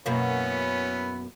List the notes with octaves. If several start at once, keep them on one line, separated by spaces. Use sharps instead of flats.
F#2 B2 A#3 B3 C#4 E4